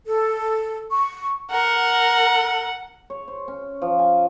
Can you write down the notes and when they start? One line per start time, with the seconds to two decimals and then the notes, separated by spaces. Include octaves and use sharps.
0.06 A4
0.91 C#6
1.51 A#4 F#5
3.10 C#5
3.28 C5
3.48 C#4
3.82 F3
3.99 G#5